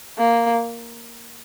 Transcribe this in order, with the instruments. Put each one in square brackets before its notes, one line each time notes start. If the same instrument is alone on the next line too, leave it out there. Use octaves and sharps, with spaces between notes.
[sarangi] A#3